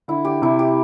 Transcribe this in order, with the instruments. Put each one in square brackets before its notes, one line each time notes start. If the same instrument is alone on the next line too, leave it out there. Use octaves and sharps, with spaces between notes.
[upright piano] D3 [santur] E4
[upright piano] D3 [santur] G4
[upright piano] C3 [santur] E4
[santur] G4